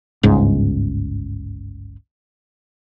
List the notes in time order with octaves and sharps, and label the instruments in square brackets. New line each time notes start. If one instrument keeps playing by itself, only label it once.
[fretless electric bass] G1 C#2 G#2